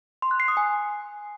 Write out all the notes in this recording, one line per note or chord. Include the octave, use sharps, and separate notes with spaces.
C6
F#6
C7
D#6
G#5